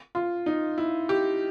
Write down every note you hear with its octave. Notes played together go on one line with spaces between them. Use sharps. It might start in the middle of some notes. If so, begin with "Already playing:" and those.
F4
D#4
E4
G4